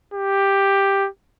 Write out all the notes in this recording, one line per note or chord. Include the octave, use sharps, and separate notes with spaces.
G4